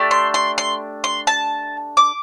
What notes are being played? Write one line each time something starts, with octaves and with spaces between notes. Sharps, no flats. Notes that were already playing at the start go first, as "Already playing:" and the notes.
Already playing: A3 D4 G4
C6
C6
C6
C6
A5
D6